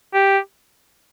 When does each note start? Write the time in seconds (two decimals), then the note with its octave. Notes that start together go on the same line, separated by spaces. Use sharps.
0.14 G4